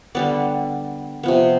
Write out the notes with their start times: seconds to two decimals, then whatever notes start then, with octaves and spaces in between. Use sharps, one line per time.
0.15 D3 G3 B3 D5
1.23 C3 F3 B3